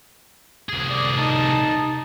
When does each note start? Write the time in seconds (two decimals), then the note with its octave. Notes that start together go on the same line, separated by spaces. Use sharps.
0.69 C2 G#4
0.90 D5
1.17 D#4 A5